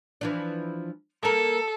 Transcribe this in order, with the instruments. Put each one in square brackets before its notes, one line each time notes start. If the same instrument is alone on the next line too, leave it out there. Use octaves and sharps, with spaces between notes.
[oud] E3 F3 D4
[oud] A#3 A#4 [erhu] A4